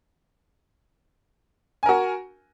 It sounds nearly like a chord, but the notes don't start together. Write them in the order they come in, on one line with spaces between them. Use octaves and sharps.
G#5 A#4 F#4